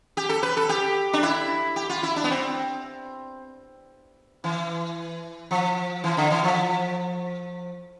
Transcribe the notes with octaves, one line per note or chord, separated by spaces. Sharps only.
G4
A4
B4
A4
G4
D4
E4
G4
F4
E4
D4
B3
C4
E3
F3
E3
D3
E3
F3